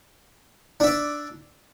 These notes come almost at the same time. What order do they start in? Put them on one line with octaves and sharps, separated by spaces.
D4 E5 D5